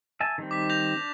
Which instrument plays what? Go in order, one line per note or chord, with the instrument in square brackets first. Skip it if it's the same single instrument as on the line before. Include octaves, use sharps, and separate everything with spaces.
[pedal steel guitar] E5 G#5 A5
D#3 G3 C4
[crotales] D6 B6
G6 A#6 F7
[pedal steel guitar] D4